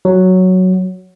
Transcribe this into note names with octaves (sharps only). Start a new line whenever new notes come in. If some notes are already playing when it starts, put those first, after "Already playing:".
F#3